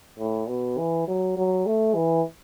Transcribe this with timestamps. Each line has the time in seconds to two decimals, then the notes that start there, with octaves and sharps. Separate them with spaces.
0.19 A2
0.48 B2
0.78 E3
1.07 F#3
1.37 F#3
1.66 A3
1.95 E3